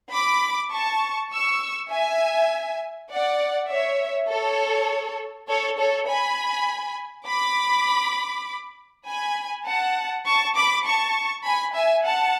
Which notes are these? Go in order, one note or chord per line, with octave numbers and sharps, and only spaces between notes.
B5 D6
A5 C#6
C#6 E6
E5 G#5
D5 F#5
C#5 E5
A4 C#5
A4 C#5
A4 C#5
G#5 B5
B5 D6
G#5 B5
F#5 A5
A5 C#6
B5 D6
A5 C#6
G#5 B5
E5 G#5
F#5 A5